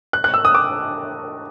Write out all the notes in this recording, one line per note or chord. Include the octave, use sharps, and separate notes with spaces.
F#6
F#6
E6
D#6
D6